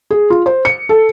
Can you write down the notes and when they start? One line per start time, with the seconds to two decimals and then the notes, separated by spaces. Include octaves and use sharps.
0.11 G#4
0.30 F4
0.46 C5
0.65 C#7
0.89 A4